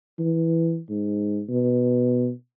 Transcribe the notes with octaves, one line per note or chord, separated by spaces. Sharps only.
E3
G#2
B2